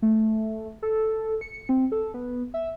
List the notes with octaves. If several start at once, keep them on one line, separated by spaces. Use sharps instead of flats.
A3
A4
C#7
C4
A4
B3
E5